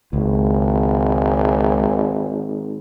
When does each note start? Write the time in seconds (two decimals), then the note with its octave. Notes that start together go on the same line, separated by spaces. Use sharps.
0.13 G#1 C#2